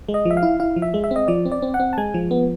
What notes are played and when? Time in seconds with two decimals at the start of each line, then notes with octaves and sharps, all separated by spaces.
0.09 G#3
0.14 D#5
0.25 F3
0.31 E5
0.37 F5
0.43 E4
0.60 E4 F5
0.76 F3
0.82 E5
0.94 G#3
1.04 E5
1.11 C4 D#5
1.28 F3 D5
1.45 C4
1.52 D5
1.62 C4
1.74 F#5
1.80 C4
1.93 A5
1.98 G#3 G#5
2.14 F3
2.31 B3